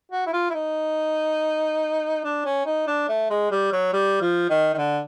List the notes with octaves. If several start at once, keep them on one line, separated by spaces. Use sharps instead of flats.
F#4
E4
F4
E4
D#4
D4
C#4
D#4
D4
A3
G#3
G3
F#3
G3
F3
D#3
D#3
D3